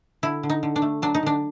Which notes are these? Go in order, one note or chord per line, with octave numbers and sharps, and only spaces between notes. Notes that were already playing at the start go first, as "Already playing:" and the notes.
D3 E4
D3
D#4
D3
D4
A3
F#3 D4
D#4
D3 D4